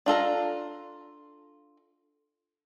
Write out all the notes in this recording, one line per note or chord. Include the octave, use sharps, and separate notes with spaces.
D4 F4 A4 A#5